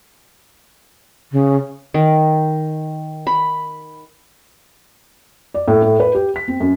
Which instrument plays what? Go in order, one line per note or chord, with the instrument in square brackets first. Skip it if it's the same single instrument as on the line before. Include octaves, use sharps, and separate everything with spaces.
[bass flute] C#3
[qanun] D#3
B5
[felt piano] D5
A2
A2
B4
G4
B6
C4
F#2